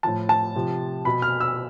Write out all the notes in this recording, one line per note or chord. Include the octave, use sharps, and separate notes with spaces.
A2 F3 A5
A5
C3 F3
B2 B5
F6
E6